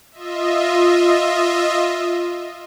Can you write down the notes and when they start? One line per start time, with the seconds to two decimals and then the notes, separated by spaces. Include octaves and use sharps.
0.12 F4 D#5 E5